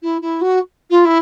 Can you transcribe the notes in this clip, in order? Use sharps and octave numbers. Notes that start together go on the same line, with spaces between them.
E4
E4
F#4
F4
E4